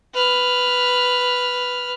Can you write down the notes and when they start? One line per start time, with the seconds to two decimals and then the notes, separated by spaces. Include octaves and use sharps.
0.14 B4 F6